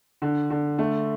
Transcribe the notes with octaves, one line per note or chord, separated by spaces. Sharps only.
D3
D3
A3